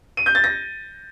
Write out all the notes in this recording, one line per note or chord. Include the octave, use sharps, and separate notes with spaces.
D#7
G6
A6
A#6